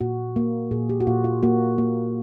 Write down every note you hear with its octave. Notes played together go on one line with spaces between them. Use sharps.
A#2 F#4
A#3
A#2 G#4
G4
F#4
A#2 F4
F4
A#3 F#4
A#3